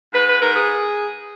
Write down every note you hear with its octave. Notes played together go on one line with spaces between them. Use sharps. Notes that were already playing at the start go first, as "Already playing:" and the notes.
G#2 B4
B4
G#2 A#4
G#4